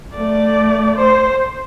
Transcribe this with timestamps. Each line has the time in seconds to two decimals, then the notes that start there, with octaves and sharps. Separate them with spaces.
0.16 A3 D5
0.96 C5